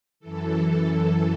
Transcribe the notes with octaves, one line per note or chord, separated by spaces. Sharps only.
F#2 E3 A4